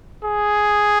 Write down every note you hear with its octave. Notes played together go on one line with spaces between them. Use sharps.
G#4